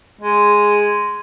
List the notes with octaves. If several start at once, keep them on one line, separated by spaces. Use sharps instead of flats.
G#3